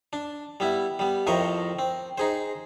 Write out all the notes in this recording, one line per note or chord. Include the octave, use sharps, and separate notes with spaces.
D4
G3 B3 E4
G3 B3
F2 A2 A#4 C5 D#5 C#6
C4
D#4 G#4 C5